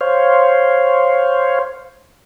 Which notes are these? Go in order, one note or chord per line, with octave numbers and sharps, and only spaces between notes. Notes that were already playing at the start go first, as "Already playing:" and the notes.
C5 C#5 F5